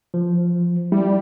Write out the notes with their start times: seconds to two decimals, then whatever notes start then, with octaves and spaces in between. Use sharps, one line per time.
0.14 F3
0.92 G3 E4